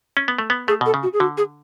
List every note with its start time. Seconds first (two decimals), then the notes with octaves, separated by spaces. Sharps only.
0.17 C#4
0.28 B3
0.38 A3
0.50 B3
0.68 A3 G#4
0.81 B2 A4
0.94 C#3
1.03 F#4
1.13 G#4
1.20 D3 F#4
1.38 G#4